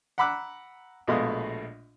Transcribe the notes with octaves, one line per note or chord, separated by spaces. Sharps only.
F#5 A#5 B5 D6 E6 F#6
A#1 B2 G#3 A3 F5 D#6